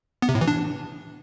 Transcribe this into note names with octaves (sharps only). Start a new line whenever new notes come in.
B3
C3
A2
E3
D4